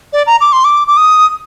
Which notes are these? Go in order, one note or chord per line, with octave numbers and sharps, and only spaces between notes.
D5
A#5
D6
C6
D6
D6
D#6